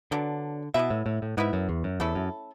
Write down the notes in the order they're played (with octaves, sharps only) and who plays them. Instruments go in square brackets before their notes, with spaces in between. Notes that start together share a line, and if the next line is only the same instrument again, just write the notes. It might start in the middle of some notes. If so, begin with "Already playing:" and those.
[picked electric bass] D3 [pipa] F#3 B3 D4
[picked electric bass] B2 [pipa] B3 E4 B4 E5
[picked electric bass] A2
A2
A2
[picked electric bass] G#2 [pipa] B3 E4 B4 E5
[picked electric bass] F#2
E2
F#2
[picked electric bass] E2 [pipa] A3 C#4 E4 A4
[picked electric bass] F#2